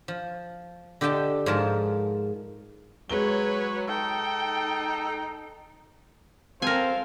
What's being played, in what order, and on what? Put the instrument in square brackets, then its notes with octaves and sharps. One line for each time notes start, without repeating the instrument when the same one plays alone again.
[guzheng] F3
D3 G4 D#5 G5 A5
G#2 F3 A#4 A5
[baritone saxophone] F#3 [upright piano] G#3 G7 [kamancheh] B4 C#5
[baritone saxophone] D#4 [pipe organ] A4 [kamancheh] G5
[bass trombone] C4 [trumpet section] F4 A4 C5 [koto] A#4 G#5 [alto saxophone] F5